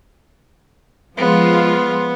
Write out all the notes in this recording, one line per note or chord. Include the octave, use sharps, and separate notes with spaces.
F3 G#3 B3 F4